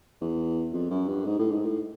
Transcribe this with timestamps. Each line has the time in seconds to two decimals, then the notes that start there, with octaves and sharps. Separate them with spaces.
0.21 E2
0.73 F2
0.90 F#2
1.08 G2
1.25 G#2
1.39 A2
1.51 G#2
1.65 A2